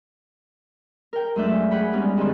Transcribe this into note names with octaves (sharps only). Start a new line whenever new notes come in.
A#4 G5
F#2 G#3 A3 D4 E5 G6
G#4 F#5 G5 B5
G3 G#3 B3 C#4 D#4
F2 G#2 D3 D#3 C4